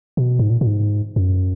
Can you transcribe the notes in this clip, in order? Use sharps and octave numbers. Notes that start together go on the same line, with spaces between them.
B2
G#2
A#2
A#2
G#2
F#2